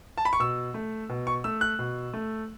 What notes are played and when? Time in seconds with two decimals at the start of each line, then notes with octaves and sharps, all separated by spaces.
0.17 A5
0.25 B5
0.33 C#6
0.40 B2 E6
0.74 A3
1.09 B2
1.27 C#6
1.44 A3 E6
1.61 F#6
1.79 B2
2.13 A3